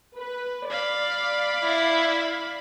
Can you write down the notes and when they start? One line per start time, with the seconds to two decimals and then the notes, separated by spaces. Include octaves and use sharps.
0.16 B4
0.70 D5 F5 B5
1.64 E4